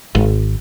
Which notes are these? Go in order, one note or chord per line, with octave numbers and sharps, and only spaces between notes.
G#1